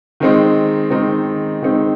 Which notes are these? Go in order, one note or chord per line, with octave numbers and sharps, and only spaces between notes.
D#3 G#3 C4 D#4
D#3 G#3 C4 D#4
D#3 G#3 C4 D#4